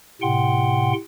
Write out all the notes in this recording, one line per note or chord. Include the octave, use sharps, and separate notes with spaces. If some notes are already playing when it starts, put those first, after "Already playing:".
A2 C3 F#5 G5 C6